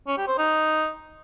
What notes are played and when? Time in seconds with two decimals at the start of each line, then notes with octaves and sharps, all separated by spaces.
0.07 C#4
0.18 G4
0.28 C5
0.38 D#4